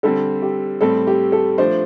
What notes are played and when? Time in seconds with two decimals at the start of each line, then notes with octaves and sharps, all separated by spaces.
0.03 D3 G3 C4 A4
0.42 G4
0.81 A2 G3 C4 A4
1.07 G4
1.32 A4
1.58 F3 A3 D4 C5